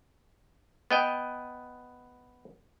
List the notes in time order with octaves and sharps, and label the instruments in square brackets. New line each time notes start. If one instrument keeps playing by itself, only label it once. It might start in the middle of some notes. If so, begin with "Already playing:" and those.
[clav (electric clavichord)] B3 D#5 G5